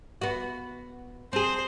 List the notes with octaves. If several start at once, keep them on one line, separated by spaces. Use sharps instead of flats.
B3 F#4
C4 G#4 C5